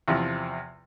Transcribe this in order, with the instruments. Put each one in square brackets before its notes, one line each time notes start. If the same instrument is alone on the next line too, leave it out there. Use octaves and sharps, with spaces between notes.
[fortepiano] E2 C3 F3